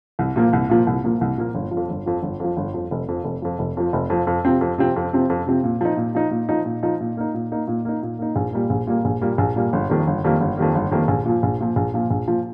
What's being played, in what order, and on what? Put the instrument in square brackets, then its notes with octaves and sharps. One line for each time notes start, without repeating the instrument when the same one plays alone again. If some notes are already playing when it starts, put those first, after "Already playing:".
[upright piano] C2
A#2 F3 A#3
C2
A#2 F3 A#3
C2
A#2 F3 A#3
C2
A#2 F3 A#3
G1
F3
F2
G1
F2 F3
G1
F2 F3
G1
F2 F3
F1
F2 F3
F1
F2 F3
F1
F2 F3
F1
F2 F3
F2
C3 F3 C4
F2
C3 F3 C4
F2
C3 F3 C4
F2
C3 F3 C4
A#2
F3 D#4
A#2
F3 D#4
A#2
F3 D#4
A#2
F3 D#4
A#2
A#3 D#4
A#2
A#3 D#4
A#2
A#3 D#4
A#2
A#3 D#4
A#1
A#2 G3 A#3
A#1
A#2 G3 A#3
A#1
A#2 G3 A#3
A#1
A#2 G3 A#3
G1
F2 D#3 G3 A#3
G1
F2 D#3 G3 A#3
G1
F2 D#3 G3 A#3
G1
F2 D#3 G3 A#3
A#1
A#2 F3
A#1
A#2 F3
A#1
A#2 F3
A#1
A#2 F3